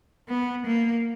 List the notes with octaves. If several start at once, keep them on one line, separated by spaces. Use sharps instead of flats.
B3
A#3